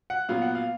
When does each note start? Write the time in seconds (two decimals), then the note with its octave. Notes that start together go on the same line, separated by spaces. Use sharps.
0.10 F#5
0.29 A#2 F#3 B3 F5
0.42 F#5
0.55 F5